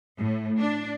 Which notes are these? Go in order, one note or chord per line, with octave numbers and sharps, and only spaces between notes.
A2
D4